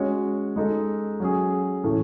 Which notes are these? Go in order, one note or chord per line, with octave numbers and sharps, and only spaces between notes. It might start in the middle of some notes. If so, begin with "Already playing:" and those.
Already playing: G#3 C#4 F#4 C#5
G#3 D#4 A4
F#3 C#4 G#4
A2 E3 A3 C#4